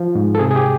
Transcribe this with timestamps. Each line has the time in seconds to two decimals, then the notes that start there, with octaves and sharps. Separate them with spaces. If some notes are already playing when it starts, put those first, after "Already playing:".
Already playing: F3
0.15 G#2
0.35 A4
0.39 C3 G#4
0.51 G#4
0.56 G4